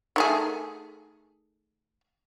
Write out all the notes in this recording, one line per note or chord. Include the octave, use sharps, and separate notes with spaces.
D#3 A3 G#4